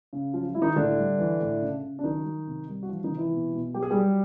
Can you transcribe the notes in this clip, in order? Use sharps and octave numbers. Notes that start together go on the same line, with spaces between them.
C#3
F3 F#3 F4
F#3 E4
D#3 D#4
A2 D3 D4
G3
E3
A2
C#3
C#3
D4
D#3 F#3 D#4
F#3
C3
G3
F#4
E3 F3 F4
D#3 D#4
C3
E3 E4
B2
B2
F#3 G4
G#4
F#3 G3 G4